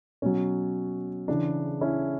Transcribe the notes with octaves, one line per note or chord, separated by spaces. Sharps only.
B2 F#3 C#4
C#3 E3 D4
C#4 E4